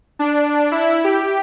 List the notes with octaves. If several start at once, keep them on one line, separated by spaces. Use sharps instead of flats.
D4
E4
G4